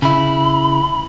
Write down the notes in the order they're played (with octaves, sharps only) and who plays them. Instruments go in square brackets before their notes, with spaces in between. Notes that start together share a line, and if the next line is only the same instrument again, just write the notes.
[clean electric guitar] C#3 E4 [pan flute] B5